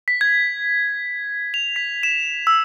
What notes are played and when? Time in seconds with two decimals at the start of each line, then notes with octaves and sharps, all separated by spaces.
0.08 B6
0.21 G#6
1.54 F7
1.76 B6
2.03 E7
2.47 E6